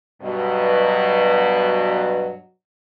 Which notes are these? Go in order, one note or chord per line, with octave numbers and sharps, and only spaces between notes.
G2 B2 F#3